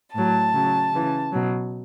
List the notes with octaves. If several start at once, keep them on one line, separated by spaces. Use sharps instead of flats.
A2 F#3 A5
C#3 F#3
C#3 E3
B2 F#3